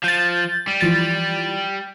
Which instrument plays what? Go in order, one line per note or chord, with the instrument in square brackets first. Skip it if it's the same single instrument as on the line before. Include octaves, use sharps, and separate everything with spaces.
[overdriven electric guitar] F3 [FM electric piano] G6 A6
[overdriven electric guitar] G3
[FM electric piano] E3 F3 A6